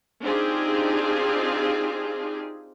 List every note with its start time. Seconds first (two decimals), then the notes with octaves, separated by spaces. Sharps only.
0.23 C4 D4 D#4 F4 G4 G#4